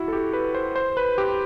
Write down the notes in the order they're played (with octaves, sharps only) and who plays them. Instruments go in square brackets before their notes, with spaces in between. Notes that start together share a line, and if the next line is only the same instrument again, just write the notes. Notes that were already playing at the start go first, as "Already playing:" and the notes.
Already playing: [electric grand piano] E4 F#4
A4
G4
B4
C5
C5
B4
G4